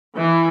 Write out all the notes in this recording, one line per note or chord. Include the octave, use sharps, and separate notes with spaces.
E3